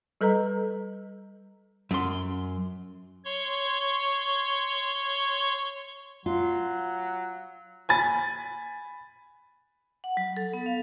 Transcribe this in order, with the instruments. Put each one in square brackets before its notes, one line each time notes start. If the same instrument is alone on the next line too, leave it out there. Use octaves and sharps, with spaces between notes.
[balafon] G3 A4 B4 D#5 A#5
[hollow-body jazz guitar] F#2 C6
[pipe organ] C#5 C6 C#6
[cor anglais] F#3 [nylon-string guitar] F4
[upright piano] G#5 B5 A6
[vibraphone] F#5
F#3
A4
B3
F5